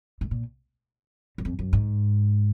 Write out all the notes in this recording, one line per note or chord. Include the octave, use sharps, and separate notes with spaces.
G#2
A#2
F#2
F2
F#2
G#2